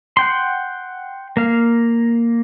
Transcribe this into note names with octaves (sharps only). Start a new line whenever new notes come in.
F#5 G5 C6
A#3 F5